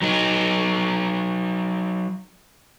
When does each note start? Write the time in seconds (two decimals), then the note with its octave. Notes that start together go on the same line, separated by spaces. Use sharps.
0.02 F#3 D#4